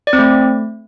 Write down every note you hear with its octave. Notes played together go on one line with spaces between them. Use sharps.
D5
C4
A3